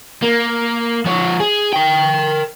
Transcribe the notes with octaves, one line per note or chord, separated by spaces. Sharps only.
A#3
F3 C#5
G#4
A#4 G5